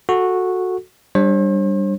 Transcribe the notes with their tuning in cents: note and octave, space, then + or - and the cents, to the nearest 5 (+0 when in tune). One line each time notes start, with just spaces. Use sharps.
F#4 -10 A4 +0
G3 +0 D4 +0 C5 +45